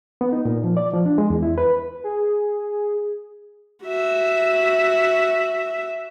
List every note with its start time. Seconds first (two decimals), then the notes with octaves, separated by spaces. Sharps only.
0.21 B3
0.33 D#4
0.45 A#2
0.64 F3
0.77 D5
0.93 F3
1.06 D4
1.18 G#3
1.30 E2
1.43 E4
1.58 B4
2.04 G#4
3.84 F#4 E5